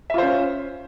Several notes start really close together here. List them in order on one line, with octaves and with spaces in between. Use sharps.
E5 F4 C5 C#4